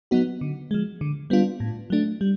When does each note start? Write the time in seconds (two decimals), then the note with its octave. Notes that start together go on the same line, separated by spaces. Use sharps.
0.11 F#3 B3 D#4 F#4
0.41 D3
0.71 F3 G#3
1.01 D3
1.30 G3 B3 D4 F4
1.60 A2
1.90 F#3 A3 D4
2.21 G3